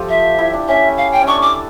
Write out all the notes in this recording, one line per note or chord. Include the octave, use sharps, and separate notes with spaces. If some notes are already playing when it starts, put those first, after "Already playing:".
Already playing: F3 A3 F4 G4 A4
E5
E4
D4
C#4 E5
F5
G5
C#4
D4 C#6
D6